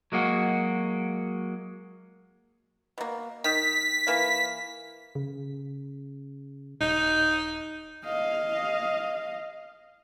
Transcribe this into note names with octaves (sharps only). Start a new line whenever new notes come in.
F#3 G#3 A#3 F#4
B2 A#3
D#3 B6
E3 A#3 F5
C#3
D#1 D#4
D#5 F5